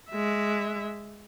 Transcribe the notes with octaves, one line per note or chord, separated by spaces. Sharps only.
G#3 E5